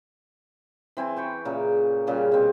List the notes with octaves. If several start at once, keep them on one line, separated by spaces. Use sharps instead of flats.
E3 C4 G#5 C6
B4 G5 C#6
A#2 C#3 A#4 B4
A#2 C#3 G3
B2 C4